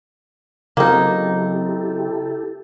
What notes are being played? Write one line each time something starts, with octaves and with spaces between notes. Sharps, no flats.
C#3 F#3 A#3 C4 D#4 E4 G4 A4